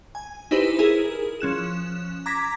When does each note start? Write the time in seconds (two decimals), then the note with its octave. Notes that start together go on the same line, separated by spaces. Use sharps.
0.15 G#5
0.51 D#4 E4 G4 B4 C5
0.79 E4 G#4 A#4
1.41 F3 C#4 F#6 E7
2.26 A#5 D6 G#6 A#6 B6